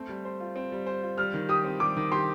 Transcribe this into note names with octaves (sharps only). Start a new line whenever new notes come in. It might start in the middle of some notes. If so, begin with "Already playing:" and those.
Already playing: A3 C4
G3
C5
F4
C4
G3
C5
F4
G3 F6
D#3
G4 D#6
C4
G3 D6
D#3
G4 C6